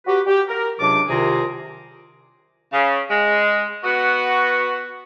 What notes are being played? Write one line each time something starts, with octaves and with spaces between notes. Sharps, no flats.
F#4 G4 B4
G4
A#4
C#2 C3 F#3 D4 D6
C2 C3 D#3 F4 G#4 A#5
C#3
G#3
B3 F#4